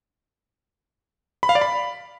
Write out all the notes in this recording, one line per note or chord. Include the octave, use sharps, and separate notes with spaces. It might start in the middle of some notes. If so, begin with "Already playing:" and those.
B5
F5
D5
B5